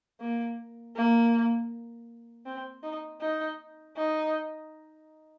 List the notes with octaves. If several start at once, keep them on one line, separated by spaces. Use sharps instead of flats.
A#3
A#3
C4
D#4
D#4
D#4